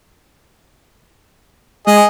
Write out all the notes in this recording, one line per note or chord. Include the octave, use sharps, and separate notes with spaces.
G#3 G#4 D#5